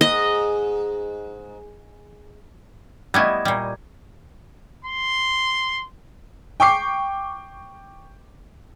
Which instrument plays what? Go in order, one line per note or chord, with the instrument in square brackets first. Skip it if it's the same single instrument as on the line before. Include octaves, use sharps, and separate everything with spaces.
[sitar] G#2 [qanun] D#5
[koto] G3 B3 E4 [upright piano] D#5 C#6 G#6
[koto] A#2 G3
[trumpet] C6
[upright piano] G5 C#6 D6 C7